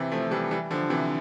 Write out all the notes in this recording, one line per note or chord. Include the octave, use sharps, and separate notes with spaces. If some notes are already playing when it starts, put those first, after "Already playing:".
Already playing: C3 E3
F3 A3
F3
E3 G3
E3 G3
D3 F3
C3 E3